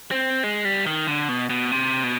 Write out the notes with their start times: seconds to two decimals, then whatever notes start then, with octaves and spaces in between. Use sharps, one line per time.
0.12 C4
0.43 G#3
0.65 G3
0.86 D#3
1.07 D3
1.29 B2
1.50 B2
1.72 C3
2.04 B2